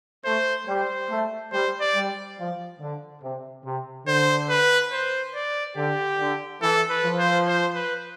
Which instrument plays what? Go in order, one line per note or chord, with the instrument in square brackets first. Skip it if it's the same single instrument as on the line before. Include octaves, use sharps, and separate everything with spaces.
[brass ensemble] A3 [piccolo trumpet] C5
[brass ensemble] G3 [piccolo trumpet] C5
[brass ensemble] A3
[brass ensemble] G3 [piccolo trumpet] C5
[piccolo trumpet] D5
[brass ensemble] G3
F3
D3
C3
C3
[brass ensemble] D3 [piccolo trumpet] C5
[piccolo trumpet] B4
C5
D5
[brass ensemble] D3 [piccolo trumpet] G4
[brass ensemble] D3
[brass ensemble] E3 [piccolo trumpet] A4
[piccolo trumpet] B4
[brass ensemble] F3
[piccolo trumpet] C5
C5
B4